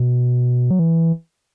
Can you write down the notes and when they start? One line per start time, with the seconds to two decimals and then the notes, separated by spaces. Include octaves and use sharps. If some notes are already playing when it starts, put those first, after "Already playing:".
Already playing: B2
0.71 F#3
0.79 E3